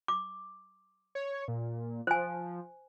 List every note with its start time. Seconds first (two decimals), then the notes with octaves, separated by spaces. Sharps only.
0.08 D6
1.15 C#5
1.48 A#2
2.07 F3 C5 G#5